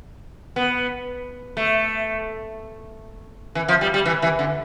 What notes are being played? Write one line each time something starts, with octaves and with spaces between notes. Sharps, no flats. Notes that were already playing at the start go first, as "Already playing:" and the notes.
B3
A3
E3
F3
G3
G3
E3
E3
D3